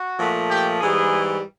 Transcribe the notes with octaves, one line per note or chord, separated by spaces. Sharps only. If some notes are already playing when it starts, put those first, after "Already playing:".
Already playing: F#4
A#2 F3 A3
G4
G#2 E3 G3 G#4